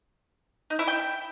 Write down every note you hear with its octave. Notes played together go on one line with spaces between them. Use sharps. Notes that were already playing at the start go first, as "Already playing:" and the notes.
D#4
E4
G5